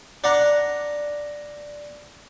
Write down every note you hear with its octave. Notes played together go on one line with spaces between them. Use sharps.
D4 F#5 A#5